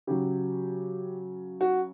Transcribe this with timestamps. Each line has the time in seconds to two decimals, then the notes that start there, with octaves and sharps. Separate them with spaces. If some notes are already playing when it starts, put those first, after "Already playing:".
0.07 C#3 F#3 G4
1.61 F#4